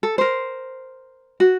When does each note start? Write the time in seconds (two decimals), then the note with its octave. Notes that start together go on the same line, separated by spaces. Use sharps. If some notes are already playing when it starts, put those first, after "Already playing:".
0.03 A4
0.18 A#4 C5
1.40 F#4